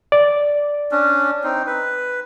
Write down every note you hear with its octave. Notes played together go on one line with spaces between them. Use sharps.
D5
C#4 D4
C4 D#4
B4